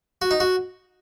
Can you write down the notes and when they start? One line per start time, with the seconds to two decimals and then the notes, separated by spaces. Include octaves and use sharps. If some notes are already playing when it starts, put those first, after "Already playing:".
0.22 F#4
0.31 D#4
0.40 F#4